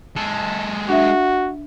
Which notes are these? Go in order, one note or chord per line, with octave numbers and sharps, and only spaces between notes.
G#3 A4
D4 F#4 E5